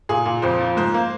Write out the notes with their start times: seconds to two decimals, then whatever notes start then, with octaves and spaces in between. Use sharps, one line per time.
0.09 A#2 G#4
0.26 A#2
0.42 F2 C5
0.60 F3
0.77 G#2 C5
0.94 A#3